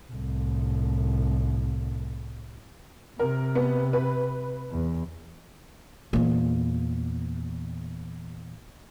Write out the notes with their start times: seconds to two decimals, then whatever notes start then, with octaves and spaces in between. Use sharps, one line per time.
0.11 C2 A2
3.19 C3 A#4
3.55 B3
3.93 B4
4.71 E2
6.13 E2 A#2